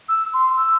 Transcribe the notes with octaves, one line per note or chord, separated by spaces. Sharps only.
E6
C6
E6